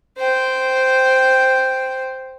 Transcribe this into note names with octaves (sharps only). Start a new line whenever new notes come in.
C5 G5